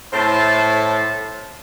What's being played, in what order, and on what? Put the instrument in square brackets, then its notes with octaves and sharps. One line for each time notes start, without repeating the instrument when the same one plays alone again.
[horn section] A2 C5 A5